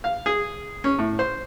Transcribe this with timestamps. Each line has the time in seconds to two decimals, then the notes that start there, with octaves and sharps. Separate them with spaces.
0.04 F5
0.26 G#4
0.84 C#4
0.99 A2
1.19 C5